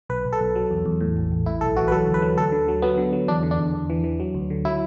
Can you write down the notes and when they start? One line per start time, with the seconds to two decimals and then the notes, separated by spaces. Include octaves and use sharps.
0.10 B1 B4
0.25 B1
0.33 A4
0.41 B1
0.55 F#3
0.71 E2
0.86 E2
1.01 A2
1.17 A1
1.32 A1
1.46 A2 E4
1.61 B1 A4
1.76 E3 F#4
1.88 B4
1.92 F#3 A4
2.08 D2
2.14 B4
2.22 F#3
2.37 D2 A4
2.52 D3
2.68 F#3
2.82 F#3 B3
2.98 D3
3.13 F#3
3.28 E2 D4
3.43 D3
3.51 D4
3.59 E2
3.74 E2
3.90 E3
4.04 E3
4.20 F#3
4.35 D2
4.50 D3
4.65 F#3 E4